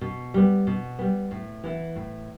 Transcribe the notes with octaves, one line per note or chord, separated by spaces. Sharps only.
B2
G3 B3
B2
G3 B3
A2
E3 B3 E4
A2